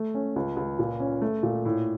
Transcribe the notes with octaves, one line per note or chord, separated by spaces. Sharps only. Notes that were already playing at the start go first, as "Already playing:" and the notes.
Already playing: A3
C#4
C#2
C#2
A#2
C#4
A3
A#2
A2